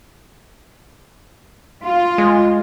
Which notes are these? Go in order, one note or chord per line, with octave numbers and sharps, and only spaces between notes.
F4
G#3